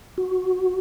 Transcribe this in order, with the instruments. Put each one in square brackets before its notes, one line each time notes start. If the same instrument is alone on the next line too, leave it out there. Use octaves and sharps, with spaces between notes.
[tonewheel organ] F#4